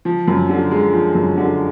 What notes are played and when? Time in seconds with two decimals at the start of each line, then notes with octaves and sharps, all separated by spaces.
0.05 F3
0.28 F#2
0.49 D3
0.71 G#3
0.93 F3
1.15 F#2
1.37 D3